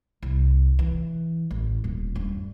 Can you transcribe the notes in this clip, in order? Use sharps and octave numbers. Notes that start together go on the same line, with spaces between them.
C2
E3
A1
D#1
G2